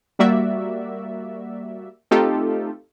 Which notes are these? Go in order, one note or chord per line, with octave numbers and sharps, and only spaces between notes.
G3 A#3 F#4 D5 E5
A3 C4 D#4 F4 G4 A4